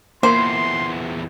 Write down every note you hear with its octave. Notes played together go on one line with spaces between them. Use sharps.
E2 A#2 A#3 C5 C6